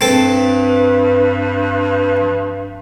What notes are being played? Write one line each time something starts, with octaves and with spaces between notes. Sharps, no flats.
G2 C4 A4 B4